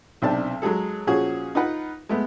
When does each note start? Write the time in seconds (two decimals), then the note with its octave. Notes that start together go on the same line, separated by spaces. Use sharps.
0.22 B1 C3 C4 D4 A5
0.62 F#3 G#3 G#4 A4
1.07 A#2 F3 C#4 F#4 G#4
1.55 D#4 F4 B4 F#5
2.09 G#3 A3 B3